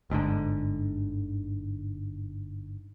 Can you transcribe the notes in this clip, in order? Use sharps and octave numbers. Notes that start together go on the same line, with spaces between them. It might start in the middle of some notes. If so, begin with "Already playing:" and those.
G1 G#2 B2 D3